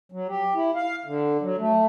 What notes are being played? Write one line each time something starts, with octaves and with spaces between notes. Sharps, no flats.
F#3
G4
E4
F5
D3
F#3
A3